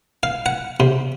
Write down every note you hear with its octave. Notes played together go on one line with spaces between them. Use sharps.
F5
F#5
C3